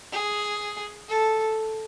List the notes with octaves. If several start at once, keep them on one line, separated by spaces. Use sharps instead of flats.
G#4
A4